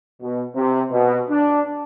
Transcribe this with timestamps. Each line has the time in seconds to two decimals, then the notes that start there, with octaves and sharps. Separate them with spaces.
0.22 B2
0.55 C3
0.91 B2
1.30 D4